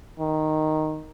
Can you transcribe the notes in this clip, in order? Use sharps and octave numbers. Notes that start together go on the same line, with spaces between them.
D#3